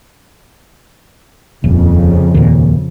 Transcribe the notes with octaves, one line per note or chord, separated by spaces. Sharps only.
D#1 F2 C#3
D#2 A#2